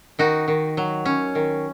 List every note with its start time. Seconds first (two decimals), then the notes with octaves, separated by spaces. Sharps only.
0.19 D#3 D#4 F#4
0.48 D#3
0.77 F#3
1.05 C#4
1.35 D#3